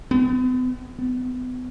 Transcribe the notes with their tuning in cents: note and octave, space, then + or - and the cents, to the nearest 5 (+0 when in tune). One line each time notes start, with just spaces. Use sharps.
B3 +40
B3 +35